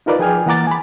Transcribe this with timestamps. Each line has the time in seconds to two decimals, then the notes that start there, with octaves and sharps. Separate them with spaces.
0.06 D#4 F4 A#4 B4 D5
0.19 F3 G#4 G5 G#5 F6
0.46 E3 A#3 F#5 A#5 D6 A6
0.67 G#5 B5